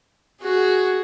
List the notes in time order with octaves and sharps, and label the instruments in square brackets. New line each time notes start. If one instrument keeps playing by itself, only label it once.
[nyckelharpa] F#4 G#4